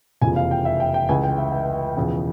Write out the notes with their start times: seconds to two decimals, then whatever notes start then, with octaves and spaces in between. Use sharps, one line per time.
0.21 F1 E2 C#3 F3 G#5
0.36 F5
0.51 G5
0.65 E5
0.80 G5
0.94 G5
1.09 C#2 C#3 E3 G#5
1.24 G5
1.38 E5
1.52 E5
1.97 E1 E2 C#3 F3